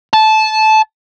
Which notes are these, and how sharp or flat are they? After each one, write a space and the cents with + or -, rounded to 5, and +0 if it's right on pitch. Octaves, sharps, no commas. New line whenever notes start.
A5 -15